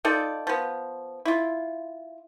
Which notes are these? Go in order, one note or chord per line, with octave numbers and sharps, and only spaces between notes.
D#4 F4 A4 D5
F3 B3
E4 F4